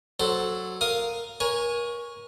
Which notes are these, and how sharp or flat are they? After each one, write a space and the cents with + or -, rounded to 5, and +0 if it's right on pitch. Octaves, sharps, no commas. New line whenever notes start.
F#3 +0 A4 +0 C5 +0
A#4 +0 F5 +0 D#6 +0
A#4 +35 C#5 +0 G#5 -10